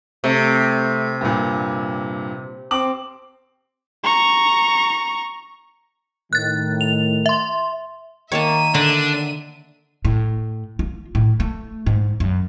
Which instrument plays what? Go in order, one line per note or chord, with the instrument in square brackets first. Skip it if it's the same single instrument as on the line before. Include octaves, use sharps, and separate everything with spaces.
[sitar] C3 [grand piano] A3
[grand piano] G2 A#2
C4 D6 F#7
[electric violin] A#5 C#6
[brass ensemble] A2 D#3 [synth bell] F#6 A6
[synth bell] F7
E5 C6
[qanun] D#3 A#3 D#5 [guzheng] C#5 A5 [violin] E5 D#7
[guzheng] D3 [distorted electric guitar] D4
[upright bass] A2
F4
A2
A3
G#2
F#2